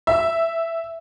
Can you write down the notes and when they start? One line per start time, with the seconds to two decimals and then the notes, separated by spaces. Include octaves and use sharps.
0.07 E5